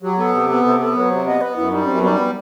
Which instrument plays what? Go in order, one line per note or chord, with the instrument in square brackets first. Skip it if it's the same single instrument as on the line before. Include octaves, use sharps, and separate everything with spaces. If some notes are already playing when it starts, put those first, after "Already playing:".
[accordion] F#3 [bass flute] G4
[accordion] B3 [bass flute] A4
[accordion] C3
B3
C3
B3
[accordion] F#3 [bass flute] B4
[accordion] C3 [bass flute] C5
[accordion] B3 [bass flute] D#5
[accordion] B3 [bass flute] B4
[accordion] F#2 [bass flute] E4
[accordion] G3 [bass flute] D#4
[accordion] F#2 [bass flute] C4
[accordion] G3 [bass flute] B3
[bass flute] D#4
B3